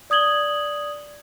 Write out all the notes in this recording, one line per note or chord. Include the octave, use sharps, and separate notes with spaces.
D5 D#6 G#6 F#7 G7